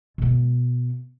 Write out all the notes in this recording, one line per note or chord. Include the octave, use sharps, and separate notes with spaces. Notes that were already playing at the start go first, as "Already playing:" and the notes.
B2 B3